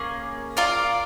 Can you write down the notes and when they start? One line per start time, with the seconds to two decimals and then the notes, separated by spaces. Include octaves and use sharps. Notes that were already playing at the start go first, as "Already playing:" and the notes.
Already playing: A#3 C#4 G#4
0.57 F4 A#4 D5 F5